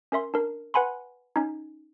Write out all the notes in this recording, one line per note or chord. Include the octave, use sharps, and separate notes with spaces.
C#4 A#4 E5 C6
D4 A#4
B4 F#5 G#5 B5 C6
C#4 D#4